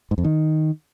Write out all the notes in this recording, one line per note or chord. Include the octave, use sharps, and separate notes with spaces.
G#2
F2
D#3